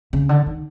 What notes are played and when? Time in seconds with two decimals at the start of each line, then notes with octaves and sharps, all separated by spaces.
0.13 C#3
0.29 D3
0.46 D#3